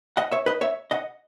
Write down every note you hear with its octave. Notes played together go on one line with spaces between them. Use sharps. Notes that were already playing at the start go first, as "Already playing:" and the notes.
D#5 F#5
C#5 E5
B4 D#5
C#5 E5
D#5 F#5